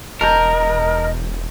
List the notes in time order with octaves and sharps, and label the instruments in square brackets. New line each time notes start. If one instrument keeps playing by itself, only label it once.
[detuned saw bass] E1 [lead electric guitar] A#4 [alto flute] D#5 [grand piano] A5 A#5 G6